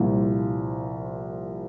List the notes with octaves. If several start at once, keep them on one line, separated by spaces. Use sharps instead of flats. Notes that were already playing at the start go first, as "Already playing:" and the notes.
Already playing: C2 A#2 F3